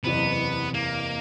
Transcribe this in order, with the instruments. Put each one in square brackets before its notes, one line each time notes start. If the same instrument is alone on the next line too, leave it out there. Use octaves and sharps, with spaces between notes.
[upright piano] F#1 E2 C3 [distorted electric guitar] B3
[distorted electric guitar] A#3